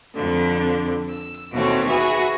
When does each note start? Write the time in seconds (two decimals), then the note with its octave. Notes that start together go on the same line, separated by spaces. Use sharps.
0.15 F2 D3
1.10 E6
1.52 D#2 B2 E3 A3 C4 C#5
1.88 F#4 G#4 B4 E5